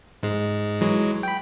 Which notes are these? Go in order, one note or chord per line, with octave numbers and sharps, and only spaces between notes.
G#2 G#3
E3 F#3 G#3
G5 B5